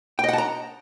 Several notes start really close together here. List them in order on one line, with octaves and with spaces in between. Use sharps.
G5 D#5 F#5 A5 A#5